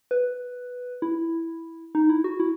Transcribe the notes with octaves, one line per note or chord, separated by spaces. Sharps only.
B4
E4
D#4
E4
F#4
E4